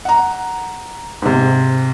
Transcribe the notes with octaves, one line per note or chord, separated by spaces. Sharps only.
F#5 A#5
G#2 C3